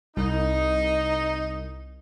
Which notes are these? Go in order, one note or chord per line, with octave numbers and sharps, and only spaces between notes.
C2 D#4